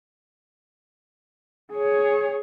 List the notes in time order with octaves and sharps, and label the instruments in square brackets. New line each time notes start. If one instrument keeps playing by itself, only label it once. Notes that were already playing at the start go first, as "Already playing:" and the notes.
[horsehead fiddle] G#4 C#5